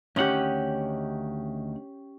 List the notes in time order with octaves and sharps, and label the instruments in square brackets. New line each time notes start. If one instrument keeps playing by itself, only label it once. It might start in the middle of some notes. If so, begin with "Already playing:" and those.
[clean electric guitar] D2 D#3 F#5 [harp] C#4 G4